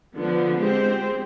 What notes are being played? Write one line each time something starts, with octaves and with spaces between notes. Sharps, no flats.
D3 F3 B3
G#3 C4 G4 C5